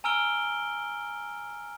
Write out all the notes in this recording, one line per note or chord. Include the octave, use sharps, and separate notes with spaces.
G#5 A#5 E6 F6 D7 G7